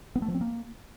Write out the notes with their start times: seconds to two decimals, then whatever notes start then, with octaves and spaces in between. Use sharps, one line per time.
0.15 B3
0.22 A3
0.28 F3
0.34 C4
0.41 A#3